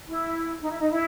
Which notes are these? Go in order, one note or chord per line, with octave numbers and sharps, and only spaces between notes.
E4
D#4
E4
D#4
E4